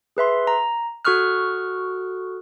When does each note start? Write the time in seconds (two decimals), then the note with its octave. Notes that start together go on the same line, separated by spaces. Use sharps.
0.17 G#4 B4 E5 C6
0.47 A#5
1.05 F#4 A4 C#6 D#6 F6 F#6